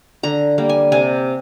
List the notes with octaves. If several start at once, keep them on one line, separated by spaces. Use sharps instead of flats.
D3 A#5
G3 A#3
G#5
C3 G#5